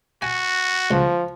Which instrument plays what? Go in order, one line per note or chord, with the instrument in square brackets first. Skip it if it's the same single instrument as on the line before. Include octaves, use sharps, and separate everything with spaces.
[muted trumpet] F#4 [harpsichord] G#5
[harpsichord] C#2 [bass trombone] F3